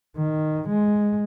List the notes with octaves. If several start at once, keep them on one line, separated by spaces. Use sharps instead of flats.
D#3
G#3